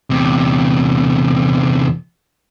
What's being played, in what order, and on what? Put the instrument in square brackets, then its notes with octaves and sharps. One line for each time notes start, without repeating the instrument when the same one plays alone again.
[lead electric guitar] E2 C3